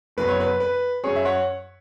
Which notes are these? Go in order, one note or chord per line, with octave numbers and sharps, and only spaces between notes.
F#1 F#2 F#3 B3 B4
C#5
B4
B4
F#2 F#3 C#4 G#4 C#5
E5
C#5 F#5